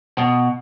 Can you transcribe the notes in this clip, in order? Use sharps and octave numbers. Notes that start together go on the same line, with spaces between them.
B2